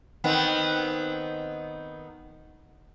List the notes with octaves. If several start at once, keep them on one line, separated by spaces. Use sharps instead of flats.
D#3 B3 C4